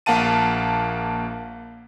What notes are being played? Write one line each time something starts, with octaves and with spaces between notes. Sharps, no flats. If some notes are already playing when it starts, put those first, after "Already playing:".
A#1 A#3 F5 F#5 A5 D#7